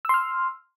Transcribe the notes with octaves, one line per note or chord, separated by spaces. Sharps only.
C6 E6 F6